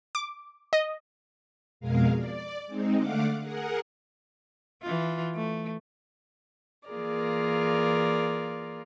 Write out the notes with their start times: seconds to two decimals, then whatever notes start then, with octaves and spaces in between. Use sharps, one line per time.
0.15 D6
0.73 D#5
1.80 F2 B2 G#3 G#4 A#4 F5
2.16 D5
2.67 G#3 C4 D#4
2.96 D3 A3 F5 F#5 D6
3.39 G#4 A#4 F#5
4.82 E3 F4
5.34 A3
6.89 E3 A#3 F4 G#4 A#4 D5